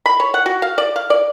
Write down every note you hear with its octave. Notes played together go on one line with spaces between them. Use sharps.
B5
C#5
F#5
F#4
F5
D5
F5
D5